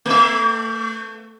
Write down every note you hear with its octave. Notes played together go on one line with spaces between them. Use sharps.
A3 E5